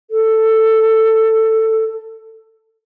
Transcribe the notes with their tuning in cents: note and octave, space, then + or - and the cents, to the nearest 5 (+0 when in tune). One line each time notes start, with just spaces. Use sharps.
A4 +10